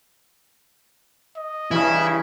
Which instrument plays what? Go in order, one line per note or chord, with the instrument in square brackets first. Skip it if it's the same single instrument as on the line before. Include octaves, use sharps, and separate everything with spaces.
[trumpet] D#5
[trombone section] G2 C#3 [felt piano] E3 [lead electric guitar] E4